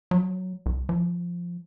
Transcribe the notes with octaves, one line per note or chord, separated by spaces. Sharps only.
F#3
C2
F3